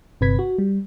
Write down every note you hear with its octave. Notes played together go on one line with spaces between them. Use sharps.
G1 C3 B4 G#6 B6
F#4
G3